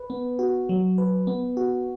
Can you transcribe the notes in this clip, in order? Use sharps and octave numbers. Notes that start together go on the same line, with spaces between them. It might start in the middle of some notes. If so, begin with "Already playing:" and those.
Already playing: B4
B3
F#4
F#3
B4
B3
F#4